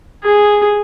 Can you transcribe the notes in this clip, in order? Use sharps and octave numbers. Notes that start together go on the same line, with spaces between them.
G#4